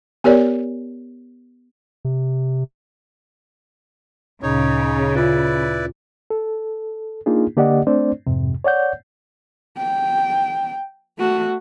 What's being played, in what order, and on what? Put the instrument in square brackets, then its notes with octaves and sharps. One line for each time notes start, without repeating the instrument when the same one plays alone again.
[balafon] B3 G4 A#4 C#5 D5
[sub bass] C3
[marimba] D2 A#2 [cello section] C#3 [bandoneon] D#4 C#5
[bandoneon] E4 B4 D5 [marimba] F4
[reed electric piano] A4
A#3 D4 D#4 F4 G#4
D3 A#3 G4 D5 D#5 F#5
A3 C4 D4 C5 D5
F2 G#2 C3
C#5 D5 F#5 G6
[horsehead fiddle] G5
A3 F#4